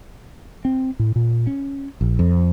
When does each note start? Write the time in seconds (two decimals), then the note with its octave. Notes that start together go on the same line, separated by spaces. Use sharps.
0.65 C4
0.99 A2
1.16 A#2
1.47 C#4
2.01 A#1
2.19 F2